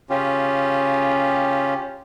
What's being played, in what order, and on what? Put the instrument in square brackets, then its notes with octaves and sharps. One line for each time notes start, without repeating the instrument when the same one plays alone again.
[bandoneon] C#3 C#4 F4 G4